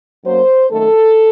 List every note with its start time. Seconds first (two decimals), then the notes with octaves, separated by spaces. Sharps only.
0.24 F#2 F#3 A#3 C5
0.70 F#2 D#3 A3 A4